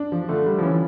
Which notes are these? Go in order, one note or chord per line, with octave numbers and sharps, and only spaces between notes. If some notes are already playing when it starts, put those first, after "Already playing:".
Already playing: D4
F3
D3 A3
G3
F3
E3 C#4